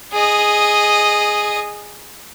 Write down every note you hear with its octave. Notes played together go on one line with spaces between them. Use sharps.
G#4 D#5